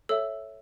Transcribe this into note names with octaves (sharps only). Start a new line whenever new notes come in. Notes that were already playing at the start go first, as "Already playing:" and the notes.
A4 C#5 E5 E6